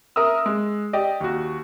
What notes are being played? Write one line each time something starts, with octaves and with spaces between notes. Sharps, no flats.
A#4 E5 D#6 E6
G#3
G4 D5 D#5
D#2 F#4